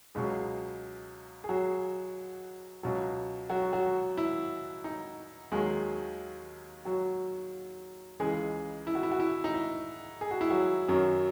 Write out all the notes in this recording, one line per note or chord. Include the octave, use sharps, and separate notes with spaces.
C#2 B2 F#3 G#3 G#4
G#4
F#3 F#4
C#2 B2 F#3
F#3 F#4
F#3 F#4
E4
D#4
D#2 D#3 F#3 G#3 G#4
F#3 F#4
C#2 C#3 E3 G#3 G#4
E4
F#4
E4
F#4
E4
D#4
E4
G#4
F#4
E4
F#3 F#4
F#2 D#3 F#3